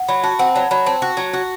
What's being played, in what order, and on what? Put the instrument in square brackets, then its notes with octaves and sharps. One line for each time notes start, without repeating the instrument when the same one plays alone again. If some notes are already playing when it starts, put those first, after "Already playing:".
Already playing: [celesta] F#5
[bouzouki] F#3 [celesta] B5
[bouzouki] F#4 [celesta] A5
[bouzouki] C4 [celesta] F#5
[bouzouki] F#3 [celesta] A5
[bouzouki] F#3 [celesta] B5
[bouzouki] C4 [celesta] A5
[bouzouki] F#4
F#3
F#4